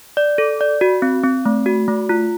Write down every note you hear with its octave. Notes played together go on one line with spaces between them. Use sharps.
D5
A4
D5
F#4
C4
C4
A3
F#4
A3
F4